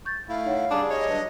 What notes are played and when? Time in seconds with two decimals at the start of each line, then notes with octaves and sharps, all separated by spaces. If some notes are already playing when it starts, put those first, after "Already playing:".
0.05 C#6 G6 A6
0.29 A3 E4 F5
0.45 D#4 C#5 F#5
0.71 G3 D4 G#4 A5 A#5 D6
0.90 C#5 D#5
1.09 F#3 D4 B4